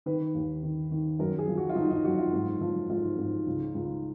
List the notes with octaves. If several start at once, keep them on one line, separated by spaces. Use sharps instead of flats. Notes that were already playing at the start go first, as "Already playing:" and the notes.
D#3 B4
D#2
D#3
D#3
F#2 A#4
G#4
F3
F#4
F4
F3 D#4
D#4
F#2 F#4
F4
G#2
F3
G#2 F4
G#2
C#2
C#2